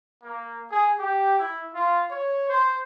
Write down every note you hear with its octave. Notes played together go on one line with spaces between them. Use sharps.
A#3
G#4
G4
E4
F4
C#5
C5